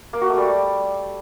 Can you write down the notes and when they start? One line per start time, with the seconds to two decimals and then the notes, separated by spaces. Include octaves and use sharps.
0.13 A#3
0.21 F#4
0.30 A3
0.38 G3